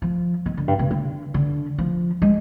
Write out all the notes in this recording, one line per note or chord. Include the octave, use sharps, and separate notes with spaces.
F3
D#3
D3
G2
C3
D3
D3
F3
G#3